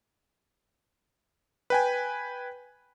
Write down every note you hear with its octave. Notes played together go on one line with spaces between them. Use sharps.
B4 G5 G#5